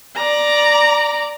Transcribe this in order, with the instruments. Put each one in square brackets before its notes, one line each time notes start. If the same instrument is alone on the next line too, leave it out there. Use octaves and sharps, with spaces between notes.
[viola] D5 A#5